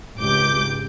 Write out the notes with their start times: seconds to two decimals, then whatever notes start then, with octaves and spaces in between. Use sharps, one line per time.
0.18 G#1 C#2 G4 D6 G6